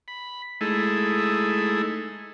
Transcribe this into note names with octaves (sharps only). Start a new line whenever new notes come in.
B5
G#3 A3 D#4 E4 G#4 A4